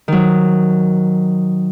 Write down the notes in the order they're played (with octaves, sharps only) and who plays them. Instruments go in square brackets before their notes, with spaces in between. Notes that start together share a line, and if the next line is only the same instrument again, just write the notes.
[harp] D#3 F#3